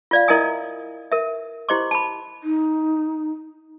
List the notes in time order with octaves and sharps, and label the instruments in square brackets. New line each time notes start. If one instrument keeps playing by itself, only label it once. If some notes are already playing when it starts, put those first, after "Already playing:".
[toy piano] F4 D5 F5
E4 A#4 D#5 E5 G#5 D#6
A#4 E5
E4 G4 C5 D#5 C6 D6
A5 B5
[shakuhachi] D#4